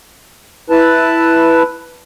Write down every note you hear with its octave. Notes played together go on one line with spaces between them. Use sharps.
E4 B4 A5